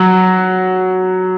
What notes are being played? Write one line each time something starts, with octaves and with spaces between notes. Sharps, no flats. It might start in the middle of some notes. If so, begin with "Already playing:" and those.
Already playing: F#3